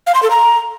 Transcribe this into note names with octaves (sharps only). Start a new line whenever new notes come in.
F5
C6
A4
A#5